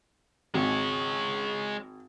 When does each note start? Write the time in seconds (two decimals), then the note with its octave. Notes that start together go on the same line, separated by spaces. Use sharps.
0.54 G#1 G#3 C#5